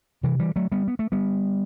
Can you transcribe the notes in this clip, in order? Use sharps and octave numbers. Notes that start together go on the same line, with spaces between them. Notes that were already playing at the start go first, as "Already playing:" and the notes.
C3 E3
E3 G3
F#3 A3
G3 B3
B3
A3
G3 B3